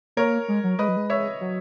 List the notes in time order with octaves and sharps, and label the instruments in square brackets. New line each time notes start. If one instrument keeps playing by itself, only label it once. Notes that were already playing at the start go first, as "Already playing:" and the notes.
[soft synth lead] A#3 [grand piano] A#4 C#5
[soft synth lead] G#3
F#3
[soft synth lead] G#3 [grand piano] B4 D#5
[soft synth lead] F#3
G#3
[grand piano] C#5 E5
[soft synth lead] F#3